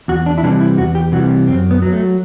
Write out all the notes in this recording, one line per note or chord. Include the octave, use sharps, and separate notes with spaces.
E2 F#4
D4
E4
C3 E3 G3 D4
E4
E2 F#4
G4
C3 E3 G3 F#4
F#2 C4
B3
F#3
A3